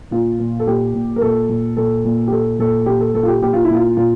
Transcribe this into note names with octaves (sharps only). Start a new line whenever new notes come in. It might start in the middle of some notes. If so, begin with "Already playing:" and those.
A#2 F4
A#2
A4
A#2 G4
A#2
A#4
A#2 A4
A#2
A#2 A4
A#2
G4
A#2 A4
A#2 A4
A#2 G4
A4
A#2 A4
F4
G4
A#2 G4
F4
A#2 E4
F4
A#2 F4